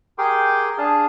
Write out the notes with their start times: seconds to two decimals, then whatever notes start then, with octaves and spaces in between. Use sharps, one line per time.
0.18 G4 G#4 A#4 G5 C6 D6
0.78 D4 G#4 F5 A5